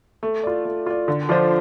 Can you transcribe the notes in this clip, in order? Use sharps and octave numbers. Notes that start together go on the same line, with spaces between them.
A3
F4 D5
A3
F4 D5
D3
F3 D4 F4 C5